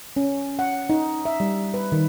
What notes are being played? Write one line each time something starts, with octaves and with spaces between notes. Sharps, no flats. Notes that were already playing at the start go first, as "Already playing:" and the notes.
C#4
F#5
D#4
E5
G3
B4
D#3